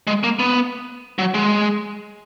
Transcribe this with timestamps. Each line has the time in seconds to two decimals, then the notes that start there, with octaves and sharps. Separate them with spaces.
0.07 G#3
0.24 A#3
0.39 B3
1.19 F#3
1.34 G#3